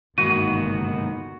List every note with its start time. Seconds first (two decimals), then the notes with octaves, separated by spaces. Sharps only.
0.18 G1 D#2 G#2 D#3 B3 F#4 D#7